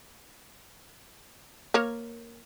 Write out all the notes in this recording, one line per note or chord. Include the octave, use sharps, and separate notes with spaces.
A#3 A#4 C#5